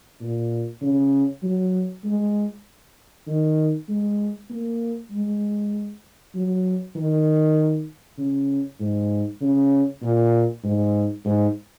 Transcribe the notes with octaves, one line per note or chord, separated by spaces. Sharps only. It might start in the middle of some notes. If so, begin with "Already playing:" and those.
A#2
C#3
F#3
G#3
D#3
G#3
A#3
G#3
F#3
D#3
C#3
G#2
C#3
A#2
G#2
G#2